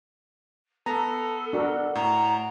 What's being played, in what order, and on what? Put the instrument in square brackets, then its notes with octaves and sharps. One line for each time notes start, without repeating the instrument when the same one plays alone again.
[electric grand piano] B3 [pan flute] A4 [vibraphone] A5 [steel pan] A#5
[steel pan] D4 F#4 A#4 [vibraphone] F#5
[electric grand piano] A2 [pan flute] A#5